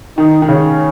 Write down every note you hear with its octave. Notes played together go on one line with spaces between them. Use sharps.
D#3 D#4
D#3
C#3 C#4